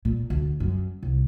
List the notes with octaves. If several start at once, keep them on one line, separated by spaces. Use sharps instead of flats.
A#2
D2
F#2
C2